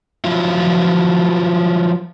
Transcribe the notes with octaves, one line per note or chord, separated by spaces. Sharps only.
F3 F#3 E4 F4